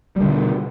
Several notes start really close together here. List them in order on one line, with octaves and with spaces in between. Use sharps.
G3 D3 B2